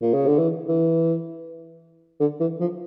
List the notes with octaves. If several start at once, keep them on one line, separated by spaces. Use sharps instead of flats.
A#2
C#3
D3
E3
E3
D3
E3
F3